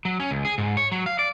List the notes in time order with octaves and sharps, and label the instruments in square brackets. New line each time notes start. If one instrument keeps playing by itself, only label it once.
[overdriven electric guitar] F#3
C#4
C#2
G#4
G#2
C#5
F#3
F5
D5